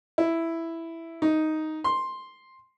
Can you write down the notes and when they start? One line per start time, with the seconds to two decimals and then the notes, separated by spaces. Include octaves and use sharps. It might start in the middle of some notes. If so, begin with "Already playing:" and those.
0.18 E4
1.22 D#4
1.84 C6